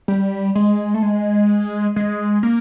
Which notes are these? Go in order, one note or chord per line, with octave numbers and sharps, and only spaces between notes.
G3
G#3
A3
G#3
G#3
A#3